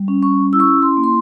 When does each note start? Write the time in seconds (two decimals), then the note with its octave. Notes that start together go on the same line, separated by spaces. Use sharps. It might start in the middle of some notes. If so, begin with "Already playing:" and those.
Already playing: G3
0.08 C#4
0.23 C#6
0.53 E4 E6
0.60 C#6
0.68 E6
0.82 C6
0.97 A#3
1.04 C6